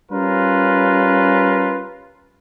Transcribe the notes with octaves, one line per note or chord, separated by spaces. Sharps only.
G3 C#4 F4 A#4 B4